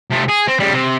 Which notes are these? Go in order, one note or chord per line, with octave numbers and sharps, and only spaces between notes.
C3 A3
G#4
C4
C#3 G3
C3